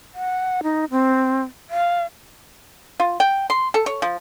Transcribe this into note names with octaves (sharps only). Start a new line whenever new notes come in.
F#5
D#4
C4
F5
F4
G5
C6
A4
C#5
F3